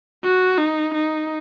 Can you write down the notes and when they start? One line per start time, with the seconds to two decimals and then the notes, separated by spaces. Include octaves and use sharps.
0.24 F#4
0.58 D#4
0.94 D#4